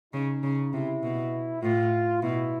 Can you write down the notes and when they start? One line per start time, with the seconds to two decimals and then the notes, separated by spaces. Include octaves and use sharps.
0.13 C#3 D#4
0.43 C#3
0.73 C3 E4
1.03 B2
1.62 A2 F4
2.22 B2 E4